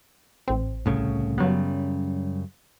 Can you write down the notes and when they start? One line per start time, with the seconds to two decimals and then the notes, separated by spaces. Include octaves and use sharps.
0.48 A1 C4
0.86 C2 A2 C#3
1.38 F#2 C#3 F#3 G3 B3